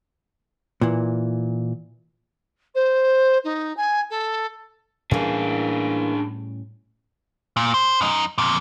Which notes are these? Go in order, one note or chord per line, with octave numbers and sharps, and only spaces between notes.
A#2 E3
C5
D#4
G#5
A4
A2 E3 G3 A#3 C#4 D4 G#4
A#2
C5
F#2 D#4
F2 A#2